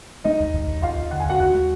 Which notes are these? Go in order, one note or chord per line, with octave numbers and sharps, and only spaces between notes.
G#3 D#4 D#5
D#2
D#2
D#2
D#2 F4 F5
D#2
D3 F#5
G#5
D#2 F#4 F#5
D#2 F#4 F#5
G#3